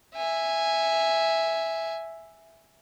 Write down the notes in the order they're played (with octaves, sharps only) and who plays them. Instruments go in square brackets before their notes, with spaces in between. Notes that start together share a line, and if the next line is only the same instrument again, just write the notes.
[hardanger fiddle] E5 G#5